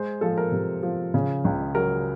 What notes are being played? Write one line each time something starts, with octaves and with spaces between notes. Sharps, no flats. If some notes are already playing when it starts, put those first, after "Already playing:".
Already playing: G#3 C5
F3 A4
A#4
C3
F3
C#3
C#2
F#3 A#4